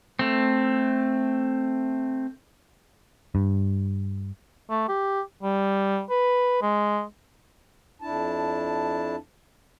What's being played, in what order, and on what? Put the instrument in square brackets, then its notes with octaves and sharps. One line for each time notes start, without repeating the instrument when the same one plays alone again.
[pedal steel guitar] A3 C4
[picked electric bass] G2
[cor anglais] A3
G4
G3
B4
G#3
[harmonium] F2 D4 E4 A5